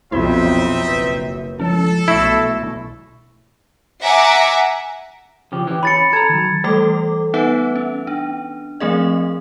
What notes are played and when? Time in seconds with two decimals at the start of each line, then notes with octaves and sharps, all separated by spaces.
0.12 B1 F2 C4 D#4 E4 C5 E5 B5
0.88 F#1 B4
1.60 F3 C#4 A4
2.08 B1 A3 E4 B5 C#6 A#6
4.02 E5 F#5 G#5 A#5 D6
5.52 C#3 F3 G4
5.67 E3 G4
5.83 C#4 B5 A6 C#7
6.13 A4 A#5 G#6
6.29 D#3 F#3
6.64 E3 G3 A3 A4 D6
7.34 B3 D#4 B4 E5 F#5
7.76 C#4
8.07 D4
8.80 F3 A3 C4 G#4 D#5